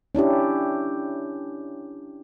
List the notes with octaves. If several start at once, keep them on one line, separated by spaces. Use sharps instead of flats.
C#4 D4 E4 G4